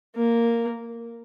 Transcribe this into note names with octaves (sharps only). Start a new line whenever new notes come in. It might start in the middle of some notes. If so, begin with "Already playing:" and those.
A#3